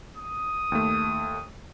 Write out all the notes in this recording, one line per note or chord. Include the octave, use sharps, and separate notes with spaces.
D#6
D#2 A3